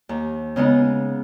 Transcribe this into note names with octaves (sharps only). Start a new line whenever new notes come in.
D#2
C#3 G#3 B3 D#4